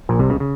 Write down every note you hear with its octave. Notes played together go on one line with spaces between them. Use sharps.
A#1 A#2
C2 C3
C#2 C#3
C#3